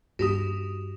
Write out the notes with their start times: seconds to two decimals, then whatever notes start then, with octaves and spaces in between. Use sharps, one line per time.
0.19 G2 D#4 F#4 G4 D#6